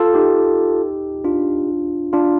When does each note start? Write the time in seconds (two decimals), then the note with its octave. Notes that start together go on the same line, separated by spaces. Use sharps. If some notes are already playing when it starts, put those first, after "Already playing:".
Already playing: F4 A4
0.14 D#4 G4
1.24 D4 F4
2.13 D4 F4